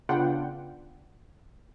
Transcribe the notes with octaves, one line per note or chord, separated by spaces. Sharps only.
C#3 B3 D4 F4 F#5 G5